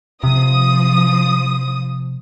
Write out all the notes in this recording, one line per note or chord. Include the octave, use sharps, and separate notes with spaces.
C3 F3 D#6